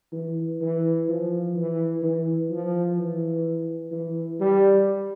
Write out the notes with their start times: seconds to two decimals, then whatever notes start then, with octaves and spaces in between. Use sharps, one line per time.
0.13 E3
0.61 E3
1.08 F3
1.56 E3
2.02 E3
2.50 F3
2.98 E3
3.92 E3
4.40 G3